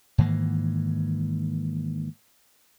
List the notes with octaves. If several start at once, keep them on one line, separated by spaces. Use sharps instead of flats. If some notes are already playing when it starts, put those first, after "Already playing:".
G#2 D#3 E3 A#3